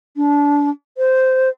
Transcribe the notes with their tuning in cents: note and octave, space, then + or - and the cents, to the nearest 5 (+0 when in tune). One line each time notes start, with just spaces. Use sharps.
D4 -25
C5 -10